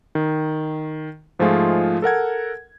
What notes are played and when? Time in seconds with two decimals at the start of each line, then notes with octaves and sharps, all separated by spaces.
0.15 D#3
1.39 G#2 F3 G#3 A3 F4 G#4
2.02 A4 A#4 F#5 G#6